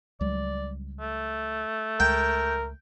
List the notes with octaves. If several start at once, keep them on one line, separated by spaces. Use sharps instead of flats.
C#2 F#3 G3 D5
A3
C#2 A#4 G5